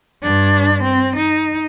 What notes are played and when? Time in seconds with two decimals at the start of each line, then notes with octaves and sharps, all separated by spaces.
0.23 G2 D4
0.83 C4
1.16 D#4